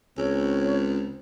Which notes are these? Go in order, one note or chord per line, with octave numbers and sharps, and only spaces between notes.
C#2 C4 C#5